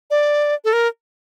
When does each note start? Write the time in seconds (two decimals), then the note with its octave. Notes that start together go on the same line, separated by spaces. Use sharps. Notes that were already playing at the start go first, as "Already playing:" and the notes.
0.11 D5
0.65 A4
0.73 A#4